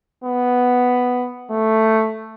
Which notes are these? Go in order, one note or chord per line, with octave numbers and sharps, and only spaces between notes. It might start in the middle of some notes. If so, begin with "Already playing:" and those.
B3
A3